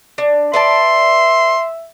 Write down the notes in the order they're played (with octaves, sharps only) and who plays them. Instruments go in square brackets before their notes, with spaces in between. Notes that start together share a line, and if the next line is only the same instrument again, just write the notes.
[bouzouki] D4
[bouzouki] B4 D5 A5 [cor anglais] E5 [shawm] C6